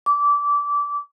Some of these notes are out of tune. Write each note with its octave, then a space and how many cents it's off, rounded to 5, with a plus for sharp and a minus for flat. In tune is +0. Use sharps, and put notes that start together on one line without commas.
D6 -20